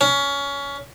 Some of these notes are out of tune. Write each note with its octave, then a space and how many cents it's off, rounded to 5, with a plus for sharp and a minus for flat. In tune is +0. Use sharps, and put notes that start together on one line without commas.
C#4 +20